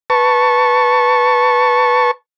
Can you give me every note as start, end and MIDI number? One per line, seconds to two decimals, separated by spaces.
0.10 2.11 71
0.10 2.11 81
0.10 2.11 85